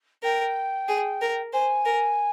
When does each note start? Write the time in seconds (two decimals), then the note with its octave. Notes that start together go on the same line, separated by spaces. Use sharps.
0.23 A#4 G5
0.88 G#4
1.22 A#4
1.53 C5 G#5
1.86 A#4